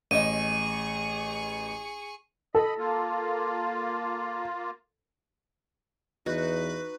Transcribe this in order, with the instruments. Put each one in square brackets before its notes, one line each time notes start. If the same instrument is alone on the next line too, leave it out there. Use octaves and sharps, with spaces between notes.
[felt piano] A1 D#5 [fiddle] G#4 C#6 [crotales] D#7
[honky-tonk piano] A4 [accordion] D#5 B5
[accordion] A#3 F4
[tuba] E2 [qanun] D#4 F#4 [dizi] B4